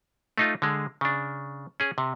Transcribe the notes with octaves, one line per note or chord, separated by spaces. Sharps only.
A3 D#4 F4
D3 G#3
C#3 D4
C#4 G#4
C3